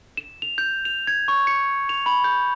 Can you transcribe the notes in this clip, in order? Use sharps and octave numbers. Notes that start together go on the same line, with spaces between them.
E7
F7
G6
F7
G#6
C#6
C#7
F7
B5
G6